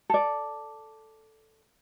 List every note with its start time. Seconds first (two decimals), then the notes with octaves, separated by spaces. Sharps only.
0.10 A4 D5